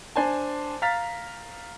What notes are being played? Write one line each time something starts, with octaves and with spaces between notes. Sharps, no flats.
D4 C5 G#5 A5
F5 A#5 F6 A6 B6